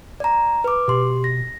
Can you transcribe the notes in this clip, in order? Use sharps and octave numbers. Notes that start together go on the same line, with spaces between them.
D5 A#5
B4 D6
B2 G4 C6
A#6